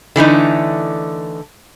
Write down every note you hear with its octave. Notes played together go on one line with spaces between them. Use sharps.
D3 E3 A3 D#4